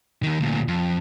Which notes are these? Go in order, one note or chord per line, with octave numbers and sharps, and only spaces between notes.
D#2 D#3
D2 A#2
F2